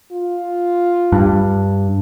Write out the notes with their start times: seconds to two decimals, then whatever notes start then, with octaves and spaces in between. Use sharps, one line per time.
0.12 F4
1.12 G2